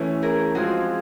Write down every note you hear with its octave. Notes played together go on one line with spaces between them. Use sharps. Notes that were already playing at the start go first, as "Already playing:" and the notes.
Already playing: E3 A3 C#4
G#4 A#4
F3 G#3 C4 F4 F#4 G#4